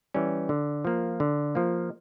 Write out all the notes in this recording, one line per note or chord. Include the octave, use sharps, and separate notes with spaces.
E3 G3 C#4
D3
F3 A#3
D3
F3 A#3